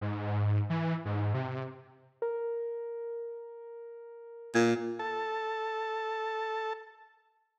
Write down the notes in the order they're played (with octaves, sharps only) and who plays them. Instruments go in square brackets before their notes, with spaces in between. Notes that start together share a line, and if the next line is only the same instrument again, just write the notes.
[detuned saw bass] G#2
E3
G#2
C3
[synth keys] A#4
[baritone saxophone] A#2 [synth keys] G#6
[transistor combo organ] A4 A5